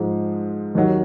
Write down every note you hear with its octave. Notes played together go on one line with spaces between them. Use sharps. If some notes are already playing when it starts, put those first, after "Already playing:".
Already playing: G#2 F3 G#3
D#2 D#3 F#3